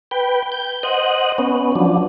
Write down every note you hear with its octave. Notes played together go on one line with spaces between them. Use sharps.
B4 G5
G6
C5 D#5 F#5
B3 C#4
F3 F#3 D4